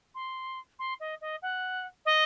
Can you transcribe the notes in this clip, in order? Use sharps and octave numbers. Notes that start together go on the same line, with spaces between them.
C6
C6
D#5
D#5
F#5
D#5